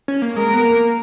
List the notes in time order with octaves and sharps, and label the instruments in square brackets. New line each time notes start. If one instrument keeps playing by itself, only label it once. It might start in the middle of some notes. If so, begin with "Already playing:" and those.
[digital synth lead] C#4
A#3
[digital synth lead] G#3 [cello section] A#4
[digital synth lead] B3
A#3